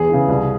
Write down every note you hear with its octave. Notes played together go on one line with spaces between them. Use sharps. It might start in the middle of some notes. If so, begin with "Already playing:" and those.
Already playing: E2 G#4
C#3 E3
C2